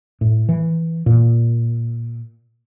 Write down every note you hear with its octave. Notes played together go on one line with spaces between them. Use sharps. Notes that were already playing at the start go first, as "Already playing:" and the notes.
A2
E3
A#2